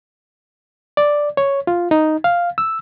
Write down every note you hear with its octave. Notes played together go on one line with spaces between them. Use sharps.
D5
C#5
F4
D#4
F5
E6